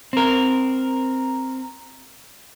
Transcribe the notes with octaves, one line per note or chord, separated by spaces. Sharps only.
C4 A#4